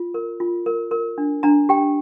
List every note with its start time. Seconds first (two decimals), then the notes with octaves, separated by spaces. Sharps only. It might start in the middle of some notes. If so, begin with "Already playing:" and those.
Already playing: F4
0.14 A#4
0.40 F4
0.66 A#4
0.91 A#4
1.18 D4
1.43 D4 A#5
1.69 G4 G5